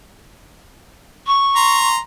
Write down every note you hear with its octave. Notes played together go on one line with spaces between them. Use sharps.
C#6
A#5 C6